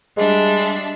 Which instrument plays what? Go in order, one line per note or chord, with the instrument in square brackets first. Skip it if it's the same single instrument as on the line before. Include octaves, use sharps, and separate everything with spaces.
[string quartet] G3 D4 E5 [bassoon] G#3